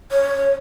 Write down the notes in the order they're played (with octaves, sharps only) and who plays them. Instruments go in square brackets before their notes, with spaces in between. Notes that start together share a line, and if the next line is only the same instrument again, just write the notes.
[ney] C#5